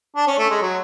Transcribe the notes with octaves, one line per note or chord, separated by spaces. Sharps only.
D4
C#4
A3
G#3
F#3